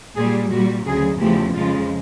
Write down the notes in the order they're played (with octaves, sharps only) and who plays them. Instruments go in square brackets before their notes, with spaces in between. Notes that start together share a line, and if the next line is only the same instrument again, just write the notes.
[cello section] A#2 G3 G#4
A#2 G3 F#4
D2 C#3 F#3 G#4
E2 C#3 F3 A3 G4
F2 C#3 F3 G#3 F4